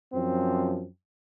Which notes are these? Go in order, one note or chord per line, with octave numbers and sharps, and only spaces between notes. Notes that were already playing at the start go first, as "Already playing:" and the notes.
F#2 F3 C4